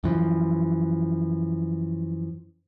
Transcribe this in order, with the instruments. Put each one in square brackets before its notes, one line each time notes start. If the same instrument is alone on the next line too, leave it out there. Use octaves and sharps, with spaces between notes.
[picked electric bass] F#2 E3 F3